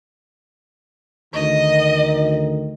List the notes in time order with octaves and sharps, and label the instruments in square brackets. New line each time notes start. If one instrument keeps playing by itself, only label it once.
[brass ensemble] D2 D#3 [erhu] D#5